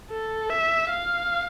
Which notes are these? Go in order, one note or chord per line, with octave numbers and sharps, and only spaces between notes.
A4
E5
F5